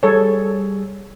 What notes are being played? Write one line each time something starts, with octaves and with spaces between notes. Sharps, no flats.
G3 G#4 A4 C#5